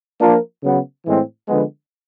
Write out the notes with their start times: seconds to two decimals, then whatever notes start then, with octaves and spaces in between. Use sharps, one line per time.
0.21 F3 A#3 D4 F4 A#4
0.63 C#3 F#3 B3
1.05 A2 E3 G#3 C4
1.48 D3 F3 G#3 B3